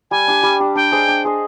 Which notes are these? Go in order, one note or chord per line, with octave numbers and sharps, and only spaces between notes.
G3 G#5
D4 G4
G3
D4 G4
D4 G5
G#4 C5 D#5
D4
G#4 C5 D#5